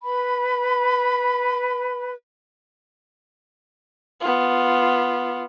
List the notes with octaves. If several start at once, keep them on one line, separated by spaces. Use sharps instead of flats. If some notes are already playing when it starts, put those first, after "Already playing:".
B4 B5
B3 F4